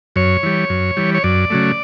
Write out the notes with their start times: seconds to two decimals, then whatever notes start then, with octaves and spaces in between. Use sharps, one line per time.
0.16 F#2 C#5
0.43 E3 G3
0.70 F#2
0.97 E3 G3
1.14 C#5
1.24 F#2 D5
1.50 C#3 F#3 A3